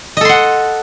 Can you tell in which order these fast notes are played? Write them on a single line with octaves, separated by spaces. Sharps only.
D#5 A4 C6 F#5